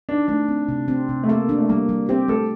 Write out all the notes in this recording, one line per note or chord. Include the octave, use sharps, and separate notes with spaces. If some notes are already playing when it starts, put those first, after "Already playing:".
D4 D#4
A3 D4
C4
C3
C4
C3
A3
A#3 A4
D4
A3
G3 A#3
G3
C4 G4
A3 A4